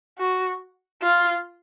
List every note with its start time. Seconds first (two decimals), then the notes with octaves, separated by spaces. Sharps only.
0.18 F#4
1.02 F4